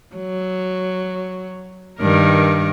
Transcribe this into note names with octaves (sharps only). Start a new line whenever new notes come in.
F#3
G2 D#3 A#4